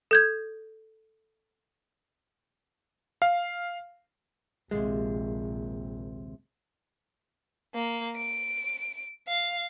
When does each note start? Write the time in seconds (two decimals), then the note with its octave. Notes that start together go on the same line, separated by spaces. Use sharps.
0.11 A4 G6 G#6
3.22 F5
4.71 A#1 D#2 C3 G#3
7.75 A#3
8.17 D7
9.28 F5